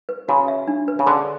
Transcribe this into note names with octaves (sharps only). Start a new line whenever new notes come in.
B4
C#3 F#4
E5
D4
B4
C#3
D3 G#4